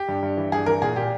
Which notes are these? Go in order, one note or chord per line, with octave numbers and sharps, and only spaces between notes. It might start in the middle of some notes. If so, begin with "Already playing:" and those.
Already playing: G4
G2
G2
E3
G2 G#4
E3 A#4
A#2 G#4
A#2 G4